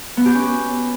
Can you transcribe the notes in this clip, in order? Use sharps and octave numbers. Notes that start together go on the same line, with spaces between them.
B3
G4
C#4